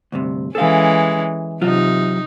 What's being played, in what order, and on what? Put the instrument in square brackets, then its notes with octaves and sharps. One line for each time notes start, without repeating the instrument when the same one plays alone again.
[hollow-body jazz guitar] D2 G2 C3
[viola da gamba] E3 G#3 C#4 [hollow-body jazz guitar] A4 F5
[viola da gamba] C3 D#4 [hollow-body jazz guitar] F#3 F4